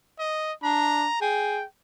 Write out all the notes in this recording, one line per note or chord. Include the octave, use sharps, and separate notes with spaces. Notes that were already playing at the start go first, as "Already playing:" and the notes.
D#5
D4 A#5
G#4 G5